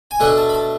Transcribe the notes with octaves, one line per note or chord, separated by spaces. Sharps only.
G#5
B2 A3 D4 F#5
A5
B5
A5